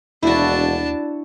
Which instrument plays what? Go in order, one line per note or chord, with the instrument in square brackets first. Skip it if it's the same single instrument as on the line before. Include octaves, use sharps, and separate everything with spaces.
[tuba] E1 [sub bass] D#2 [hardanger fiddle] D4 A5 [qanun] E4 F#4